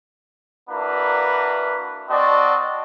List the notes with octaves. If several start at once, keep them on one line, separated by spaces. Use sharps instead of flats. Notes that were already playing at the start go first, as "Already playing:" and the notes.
A#3 D4 E4 F#4 B4
C4 F#4 D5 D#5 A5